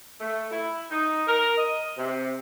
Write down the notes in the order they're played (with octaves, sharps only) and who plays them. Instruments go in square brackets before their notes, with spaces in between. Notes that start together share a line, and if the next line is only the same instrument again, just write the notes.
[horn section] A3
E4
D#4
A#4
D#5
C3